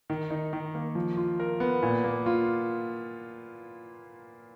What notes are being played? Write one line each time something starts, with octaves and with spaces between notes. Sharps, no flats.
D#3
D#4
D#3
A#3
F3
F4
A#4
B3
A#2
A#3
F4